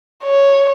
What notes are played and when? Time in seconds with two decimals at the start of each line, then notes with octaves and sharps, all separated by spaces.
0.24 C#5